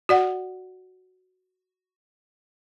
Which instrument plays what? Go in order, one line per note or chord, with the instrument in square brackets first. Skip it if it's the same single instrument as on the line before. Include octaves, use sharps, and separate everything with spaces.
[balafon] F#4 D5 F#5